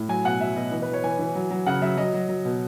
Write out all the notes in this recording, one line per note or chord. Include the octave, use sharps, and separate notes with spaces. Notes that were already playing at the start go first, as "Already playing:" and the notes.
Already playing: A2
F#3 G#5
B2 F#5
F#3 E5
B2 D#5
E3 D#5
B4
E3
C#5
E3 G#5
E3
F#3
F#3
C#3 F#5
F#3 E5
F#3 D#5
F#3
F#3
B2